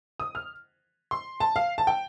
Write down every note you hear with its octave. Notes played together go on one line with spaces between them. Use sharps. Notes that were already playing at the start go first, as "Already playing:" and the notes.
D#6
F6
C6
A5
F5
A5
G5